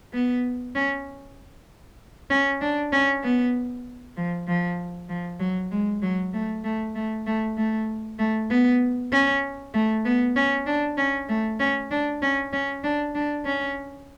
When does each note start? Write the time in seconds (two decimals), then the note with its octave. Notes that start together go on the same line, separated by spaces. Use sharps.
0.13 B3
0.75 C#4
2.30 C#4
2.61 D4
2.92 C#4
3.24 B3
4.17 F3
4.48 F3
5.09 F3
5.40 F#3
5.71 G#3
6.02 F#3
6.34 A3
6.64 A3
6.95 A3
7.27 A3
7.57 A3
8.19 A3
8.50 B3
9.12 C#4
9.74 A3
10.05 B3
10.36 C#4
10.67 D4
10.98 C#4
11.29 A3
11.60 C#4
11.91 D4
12.22 C#4
12.53 C#4
12.84 D4
13.15 D4
13.46 C#4